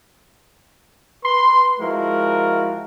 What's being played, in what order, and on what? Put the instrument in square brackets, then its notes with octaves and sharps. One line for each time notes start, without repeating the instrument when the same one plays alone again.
[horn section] B4 C6
F3 G#3 E4 F#4 A#4